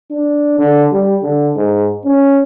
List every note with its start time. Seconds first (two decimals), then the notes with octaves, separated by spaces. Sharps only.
0.11 D4
0.59 D3
0.92 G3
1.23 D3
1.56 G#2
2.05 C#4